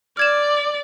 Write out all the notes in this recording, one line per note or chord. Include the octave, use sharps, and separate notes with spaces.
D5 F6 G#6 E7